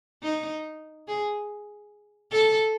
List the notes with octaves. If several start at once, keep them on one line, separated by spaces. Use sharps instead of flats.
D#4
G#4
A4